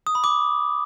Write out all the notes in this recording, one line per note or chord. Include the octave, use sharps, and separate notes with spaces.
D#6
B5
D6